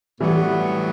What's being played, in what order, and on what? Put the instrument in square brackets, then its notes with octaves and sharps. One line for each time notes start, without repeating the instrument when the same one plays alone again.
[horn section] A2 F#3 B3 [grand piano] E3 G3